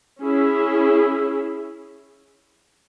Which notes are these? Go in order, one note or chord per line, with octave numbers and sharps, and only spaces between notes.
C#4 E4 G#4